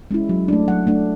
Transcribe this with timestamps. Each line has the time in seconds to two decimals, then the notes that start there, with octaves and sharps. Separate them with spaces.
0.11 G#3 C#4 E4
0.29 F#3
0.48 A3 D4
0.68 F#3 F#5
0.87 A3 D4